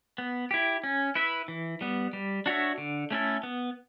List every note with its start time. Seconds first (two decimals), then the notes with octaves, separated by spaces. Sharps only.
0.18 B3
0.51 E4 G4
0.84 C#4
1.15 E4 B4 E5
1.48 E3
1.81 G3 B3
2.13 G3
2.46 D4 F#4 C#5 E5
2.78 D3
3.11 A3 C#4 E4 A4
3.43 B3